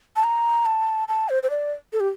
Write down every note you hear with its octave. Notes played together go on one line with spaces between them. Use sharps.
A5
A#5
A5
A5
C5
C5
D5
A4
G4